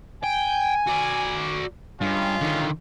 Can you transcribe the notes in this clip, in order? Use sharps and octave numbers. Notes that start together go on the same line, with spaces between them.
G5 G#5
F#4 D5
G2 G#3 C#4 F4
D3 D#3